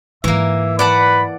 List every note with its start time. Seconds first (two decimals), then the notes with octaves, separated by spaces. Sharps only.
0.24 G#2 E3 F#3 A#3 E5
0.79 B4 D5 F#5 A5 B5